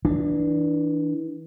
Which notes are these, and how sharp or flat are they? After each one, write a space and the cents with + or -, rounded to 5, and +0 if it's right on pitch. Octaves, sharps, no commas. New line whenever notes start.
E3 -25 D4 +0